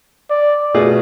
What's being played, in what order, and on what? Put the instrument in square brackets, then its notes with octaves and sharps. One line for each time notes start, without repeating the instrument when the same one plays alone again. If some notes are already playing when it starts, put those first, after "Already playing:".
[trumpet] D5
[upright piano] B2 A3 F4 G#4